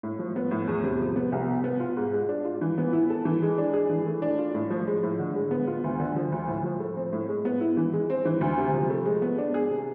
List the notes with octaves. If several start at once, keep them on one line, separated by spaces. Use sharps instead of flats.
A2
F3
B3
A2
E2
C3
F3
B3
C2
B2
B3
F4
G#2
G#3
D4
F4
E3
B3
E4
A4
E3
G#3
D4
G#4
E3
A3
D4
F4
A2
F3
G#3
A2
D3
G#3
B3
F4
D2
D3
F3
D2
A2
F3
A3
C4
A2
G#3
B3
E4
E3
G#3
C4
E3
D2
C3
F3
A3
G#3
B3
D4
G#4
C3